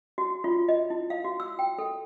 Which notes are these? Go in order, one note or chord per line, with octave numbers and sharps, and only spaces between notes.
F#4
F4
D#5
E4
F5
F#4
E6
G5
A4